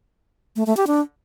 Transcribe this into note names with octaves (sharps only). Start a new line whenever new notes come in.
A3
A3
G4
D4